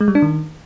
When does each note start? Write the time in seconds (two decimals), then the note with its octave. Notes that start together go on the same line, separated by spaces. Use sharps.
0.01 G#3
0.08 G3
0.15 D4
0.22 D#3